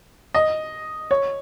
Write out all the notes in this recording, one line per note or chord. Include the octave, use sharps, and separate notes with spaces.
D#5
C#5